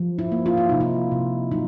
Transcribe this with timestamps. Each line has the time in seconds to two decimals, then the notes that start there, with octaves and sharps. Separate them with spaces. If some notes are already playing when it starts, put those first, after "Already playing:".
Already playing: F3
0.19 E4
0.32 A#3
0.46 F4
0.57 E4
0.69 C3 D#4
0.81 E4
1.12 C3
1.51 F#3 D#4